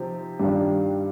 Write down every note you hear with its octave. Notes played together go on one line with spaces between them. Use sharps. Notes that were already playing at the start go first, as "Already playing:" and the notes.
Already playing: C3 F3 C4 D#4 G4
G2 D#3 G3 D4 F4